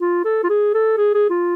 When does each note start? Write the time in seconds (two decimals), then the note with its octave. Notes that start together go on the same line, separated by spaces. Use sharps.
0.01 F4
0.25 A4
0.44 F4
0.49 G#4
0.74 A4
0.97 G#4
1.14 G#4
1.30 F4